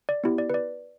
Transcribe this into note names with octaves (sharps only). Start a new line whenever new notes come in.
D5
B3 E4 G4
D5
B4
D5